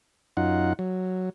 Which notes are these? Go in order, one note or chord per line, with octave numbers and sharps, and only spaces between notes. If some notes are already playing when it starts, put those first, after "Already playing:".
F#2 D#4 F4 F#5
F#3